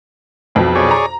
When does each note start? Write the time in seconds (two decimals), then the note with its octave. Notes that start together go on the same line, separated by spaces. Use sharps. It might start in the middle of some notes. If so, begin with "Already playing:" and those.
0.55 B1 F2 B2
0.75 G#4 C#5 D5
0.91 A#5